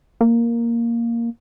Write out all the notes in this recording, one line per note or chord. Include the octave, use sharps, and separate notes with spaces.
A#3